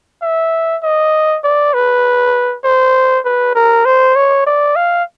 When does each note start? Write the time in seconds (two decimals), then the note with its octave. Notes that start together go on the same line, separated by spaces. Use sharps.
0.22 E5
0.83 D#5
1.44 D5
1.74 B4
2.64 C5
3.25 B4
3.55 A#4
3.85 C5
4.15 C#5
4.46 D5
4.76 F5